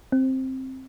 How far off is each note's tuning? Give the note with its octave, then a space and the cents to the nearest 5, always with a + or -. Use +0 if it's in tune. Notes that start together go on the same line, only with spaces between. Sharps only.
C4 +5